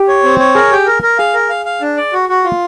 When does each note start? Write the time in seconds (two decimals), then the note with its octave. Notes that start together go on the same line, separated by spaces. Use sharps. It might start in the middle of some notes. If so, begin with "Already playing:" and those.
Already playing: G4
0.08 C#5
0.23 C4
0.39 C#5
0.55 G#4 A#4
0.71 G4
0.86 A#4
1.02 A#4
1.18 G#4 F5
1.34 A#4
1.50 F5
1.65 F5
1.81 D4
1.97 D5
2.13 F#4
2.29 F#4
2.44 F4